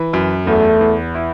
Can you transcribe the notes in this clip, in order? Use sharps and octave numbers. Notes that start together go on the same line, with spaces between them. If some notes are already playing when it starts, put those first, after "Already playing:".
Already playing: E3
F#2
E2 A3
E2
E4